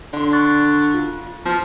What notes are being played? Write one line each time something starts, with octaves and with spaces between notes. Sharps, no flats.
D3 D5 C6
C#6 F#6 A6
F4
F3 B3